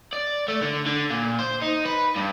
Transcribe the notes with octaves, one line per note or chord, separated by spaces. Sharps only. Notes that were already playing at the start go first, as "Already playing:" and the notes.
D5
A3
D3
D3
A#2
C5
D#4
B4
G2